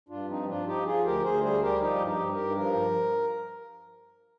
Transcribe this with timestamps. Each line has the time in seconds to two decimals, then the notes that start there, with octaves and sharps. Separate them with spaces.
0.09 G2 D4 F4
0.28 F3 C4 D#4
0.47 F3 D4 F4
0.66 F3 D#4 G4
0.85 F3 F4 G#4
1.04 D2 G4 A#4
1.23 D2 G#4 C5
1.42 G3 G#4 C5
1.62 G3 G4 A#4
1.80 F3 D#4 G4
2.00 G2
2.06 D#4 G4
2.19 G2
2.32 G4 A#4
2.38 G2
2.57 F3 A#4